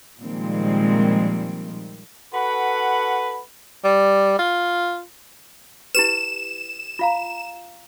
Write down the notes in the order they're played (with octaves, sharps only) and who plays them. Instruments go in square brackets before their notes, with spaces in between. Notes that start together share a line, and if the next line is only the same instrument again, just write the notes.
[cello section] A#2 D#3 F3 G3 G#3 C4
[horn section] F#4 A4 B4 F#5 B5
[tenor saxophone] G3
F4
[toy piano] E4 G4 B4 [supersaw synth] E7
[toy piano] F4 F5 A#5